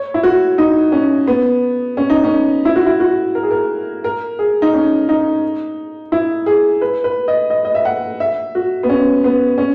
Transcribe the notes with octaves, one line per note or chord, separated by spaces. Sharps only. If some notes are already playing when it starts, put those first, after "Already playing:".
Already playing: C#5
E4
F#4
D#4
C#4
B3
C#4
D#4
C#4
E4
F#4
E4
F#4
A#4
G#4
A#4
A#4
G#4
D#4
C#4
D#4
E4
G#4
B4
B4
D#5
D#5
D#5
E5
F#5
E5
F#4
B3
C#4
B3
C#4